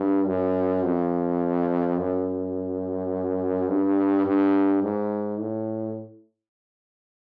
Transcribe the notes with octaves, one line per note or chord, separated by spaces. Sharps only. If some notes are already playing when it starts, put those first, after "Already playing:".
Already playing: G2
F#2
F2
F#2
G2
G2
G#2
A2